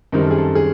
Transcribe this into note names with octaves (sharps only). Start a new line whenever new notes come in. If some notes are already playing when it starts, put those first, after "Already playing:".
F#2 D#3 G3 C4 A#4
A4
G#4
A4
G#4